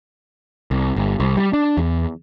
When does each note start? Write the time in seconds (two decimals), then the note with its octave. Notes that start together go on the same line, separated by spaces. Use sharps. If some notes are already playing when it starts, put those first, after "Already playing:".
0.71 C2
0.96 G1
1.20 C2
1.37 G3
1.53 D4
1.77 E2